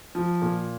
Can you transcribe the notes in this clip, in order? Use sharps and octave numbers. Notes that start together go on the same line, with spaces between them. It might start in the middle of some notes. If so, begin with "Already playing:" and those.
F3
A#2